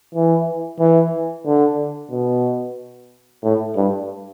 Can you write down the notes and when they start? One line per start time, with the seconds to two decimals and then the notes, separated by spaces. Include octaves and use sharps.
0.15 E3
0.79 E3
1.46 D3
2.11 B2
3.43 A2
3.76 G2